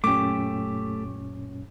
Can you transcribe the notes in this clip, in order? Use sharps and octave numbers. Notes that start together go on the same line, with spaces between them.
F#2 A#2 A3 C#4 G4 D6